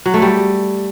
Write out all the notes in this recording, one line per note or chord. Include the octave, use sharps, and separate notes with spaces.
F#3
A3
G3